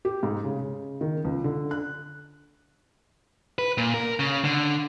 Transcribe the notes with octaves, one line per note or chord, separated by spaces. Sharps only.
G4
G#2
C#3
C#3
D#3
C#2
D3
F#6
B4
A#2
A#4
C#3
D3